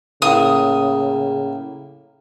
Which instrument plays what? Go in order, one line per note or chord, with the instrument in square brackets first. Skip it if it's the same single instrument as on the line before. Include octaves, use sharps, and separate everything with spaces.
[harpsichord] A2 A#3 [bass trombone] C#3 [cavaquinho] D#6